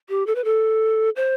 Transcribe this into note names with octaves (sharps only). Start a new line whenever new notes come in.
G4
A4
B4
A4
C5